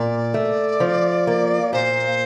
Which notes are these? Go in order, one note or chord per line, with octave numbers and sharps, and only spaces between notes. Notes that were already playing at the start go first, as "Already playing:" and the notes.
Already playing: A#2 D5
A3
F3
A#3
A#2 C5